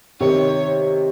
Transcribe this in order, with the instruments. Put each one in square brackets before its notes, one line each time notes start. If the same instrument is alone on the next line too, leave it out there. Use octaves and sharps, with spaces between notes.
[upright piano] C3 D#3 [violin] C#5